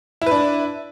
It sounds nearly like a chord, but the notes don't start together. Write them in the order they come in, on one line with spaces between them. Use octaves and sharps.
E4 B4 D4